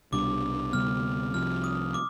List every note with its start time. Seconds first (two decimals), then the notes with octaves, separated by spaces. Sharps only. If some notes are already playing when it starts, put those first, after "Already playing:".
0.12 C2 B2 G3 D4 D6
0.73 D2 C3 G3 B3 F6
1.34 C2 C3 F3 F6
1.64 D#6
1.94 D6